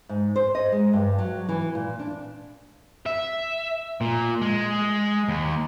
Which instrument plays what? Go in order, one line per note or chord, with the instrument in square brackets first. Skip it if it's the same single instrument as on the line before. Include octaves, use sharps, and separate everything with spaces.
[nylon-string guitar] G#2
C5
D#5
G#3
G2
F#3
E3
A#2
D4
[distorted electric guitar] E5
A#2
G#3
D#2